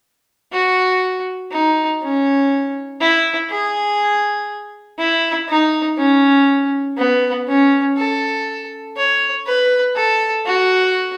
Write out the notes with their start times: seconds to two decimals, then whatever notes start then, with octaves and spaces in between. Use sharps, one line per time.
0.52 F#4
1.51 D#4
2.02 C#4
3.01 E4
3.50 G#4
4.99 E4
5.49 D#4
5.98 C#4
6.97 B3
7.47 C#4
7.97 A4
8.97 C#5
9.46 B4
9.96 A4
10.46 F#4